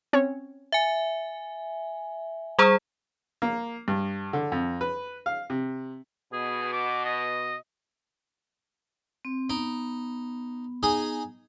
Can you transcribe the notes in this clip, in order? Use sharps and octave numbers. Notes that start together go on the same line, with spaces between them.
C4 C#4 C#5
E5 G#5
G3 G#4 C5 A#5 C#6 D#6
A#3
G2
D3
F2
B4
F5
C3
B2 G#4
D6
D#5
C4
B3 D#4
D#4 G#4 D#6